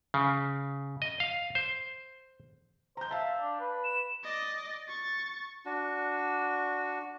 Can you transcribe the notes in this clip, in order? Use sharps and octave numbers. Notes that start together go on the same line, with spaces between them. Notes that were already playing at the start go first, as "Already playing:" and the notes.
C#3
D#5
F5
C5
C5 A#5 G6
E5 F5 A5
D4
B4
E7
D5 D#5
C#6 A6
D4 F#4